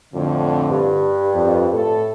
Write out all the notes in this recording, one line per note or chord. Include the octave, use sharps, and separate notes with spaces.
F2 A2 D3
G2
F2
A2 A4